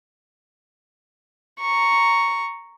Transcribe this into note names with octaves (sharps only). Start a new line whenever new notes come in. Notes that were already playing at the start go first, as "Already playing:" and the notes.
A#5 C#6